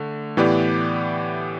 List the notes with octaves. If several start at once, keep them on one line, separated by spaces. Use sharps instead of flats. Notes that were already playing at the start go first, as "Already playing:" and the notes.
Already playing: D3 A3
A2 E3 B3 G4 D5